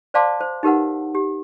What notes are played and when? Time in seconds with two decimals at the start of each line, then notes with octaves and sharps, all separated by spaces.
0.14 C5 D5 F5 A5 C6 D6
0.41 C5
0.63 D#4 G4 A#4 B4 F#5
1.15 G4